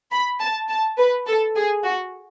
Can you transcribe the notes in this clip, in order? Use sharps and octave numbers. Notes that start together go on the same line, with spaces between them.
B5
A5
A5
B4
A4
G#4
F#4